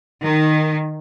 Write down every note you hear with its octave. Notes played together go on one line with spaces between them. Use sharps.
D#3